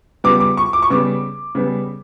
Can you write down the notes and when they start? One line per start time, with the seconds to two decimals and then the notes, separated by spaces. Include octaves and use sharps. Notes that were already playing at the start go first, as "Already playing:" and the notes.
0.24 C#3 G3 B3 D6
0.40 D6
0.57 C#6
0.73 D6
0.82 C#6
0.90 C#3 G3 B3 D6
1.55 C#3 G3 B3